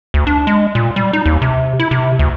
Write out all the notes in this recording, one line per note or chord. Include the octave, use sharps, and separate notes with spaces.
D2
D4
G#3
A#2
G3
D#4
D#2
C3
E4
C3
D2